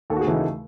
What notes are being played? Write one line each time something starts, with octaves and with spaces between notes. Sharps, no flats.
D#2 A4
F#4
G#4
C#3 E3 A3 D#4 E4